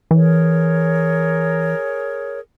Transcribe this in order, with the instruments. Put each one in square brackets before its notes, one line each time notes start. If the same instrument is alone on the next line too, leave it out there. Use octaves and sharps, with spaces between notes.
[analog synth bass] E3 [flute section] G#4 A#4 C#5